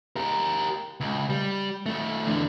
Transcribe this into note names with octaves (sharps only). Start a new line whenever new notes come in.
G4 A#4
C#2
G3
D#3 A3
E2 D3